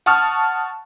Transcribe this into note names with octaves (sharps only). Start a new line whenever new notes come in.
F#5 A5 C#6 D#6 F6